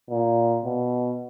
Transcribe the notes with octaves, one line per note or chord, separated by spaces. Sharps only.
A#2
B2